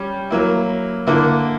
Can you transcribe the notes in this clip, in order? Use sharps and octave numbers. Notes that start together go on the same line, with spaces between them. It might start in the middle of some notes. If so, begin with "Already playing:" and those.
Already playing: G3 C#4
F#3 A#3 E4
D3 A#3 E4